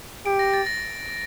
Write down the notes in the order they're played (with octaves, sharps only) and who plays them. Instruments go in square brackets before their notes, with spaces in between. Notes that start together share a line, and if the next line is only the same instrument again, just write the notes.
[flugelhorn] G4 [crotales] D7
[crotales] A#6
A6
A#6